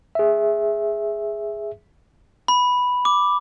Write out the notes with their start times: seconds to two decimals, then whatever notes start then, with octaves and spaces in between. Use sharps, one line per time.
0.15 G#4 E5
2.48 B5
3.05 D6